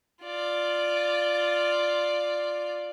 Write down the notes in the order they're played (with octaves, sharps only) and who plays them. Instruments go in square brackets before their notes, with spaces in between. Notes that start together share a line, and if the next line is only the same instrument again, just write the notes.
[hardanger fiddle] F4 D5